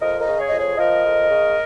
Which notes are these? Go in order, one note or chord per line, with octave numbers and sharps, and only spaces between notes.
F2 A#4 D#5
A#4 D#5
C#3
G#4 C#5
F2 D#5
G#4 C#5
F3 A#4 D#5
F2
C#3